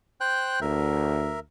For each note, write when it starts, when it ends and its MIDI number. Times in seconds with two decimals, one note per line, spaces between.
0.20 0.60 72
0.20 0.60 79
0.20 0.60 90
0.61 1.42 38
0.61 1.40 70
0.61 1.40 76